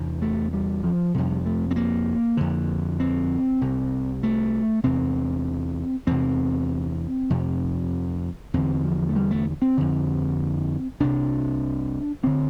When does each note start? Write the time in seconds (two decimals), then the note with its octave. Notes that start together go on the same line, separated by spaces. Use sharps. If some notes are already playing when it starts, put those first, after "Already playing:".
Already playing: E2 C3
0.22 A3
0.53 G3
0.84 F3
1.14 F2 C3 G3
1.46 A3
1.71 C4
1.76 A#3
2.37 F2 D3
3.00 C4
3.61 C2 C3
4.23 A3
4.83 E2 C3 C4
6.07 E2 C3 C4
7.30 F2 C3
8.54 E2 D3 C4
8.84 F3
9.09 A3
9.16 G3
9.31 A3
9.62 C4
9.77 F2 D3
11.00 C2 C3 D4
12.23 D2 D3 C4